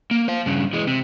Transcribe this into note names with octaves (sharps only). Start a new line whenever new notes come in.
A#3
C5 F5
G2 C#3
E3 G#3
C3